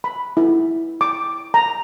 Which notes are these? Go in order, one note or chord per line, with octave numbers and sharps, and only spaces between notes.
B5
E4
D6
A#5